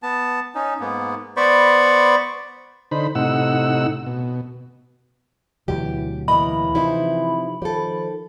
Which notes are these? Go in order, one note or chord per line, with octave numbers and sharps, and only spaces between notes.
B3 A5
C#4 D#4
G#2 A#3 B3
B3 C5 D5 B5 C#6
D3 D#4 C5 B5
A2 C3 D#4 F#5 E6
B2
D2 B2 E3 F#3 G4
A2 E3 A#3 D#5 B5
C3 F3 C4 D#4 E4
D#3 F3 G4 A4